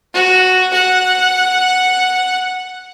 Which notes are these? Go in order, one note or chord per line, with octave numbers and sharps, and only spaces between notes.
F#4
F#5